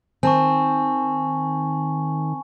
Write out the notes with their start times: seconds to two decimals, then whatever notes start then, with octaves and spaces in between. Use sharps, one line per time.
0.23 D#3 C4 G#5 A5 C#6